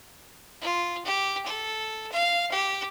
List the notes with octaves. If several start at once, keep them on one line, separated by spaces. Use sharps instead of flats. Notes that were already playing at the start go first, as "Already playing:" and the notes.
F4
G4
A4
F5
G4